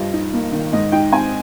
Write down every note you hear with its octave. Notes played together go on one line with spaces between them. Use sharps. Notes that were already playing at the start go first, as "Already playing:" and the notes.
Already playing: G2 F3 D#5
D#4
A#3
D#3
G#2 D#5
D#4 G5
C4 G#5